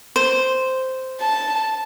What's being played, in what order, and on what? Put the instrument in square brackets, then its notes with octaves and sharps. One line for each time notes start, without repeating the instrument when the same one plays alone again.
[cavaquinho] C5
[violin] A5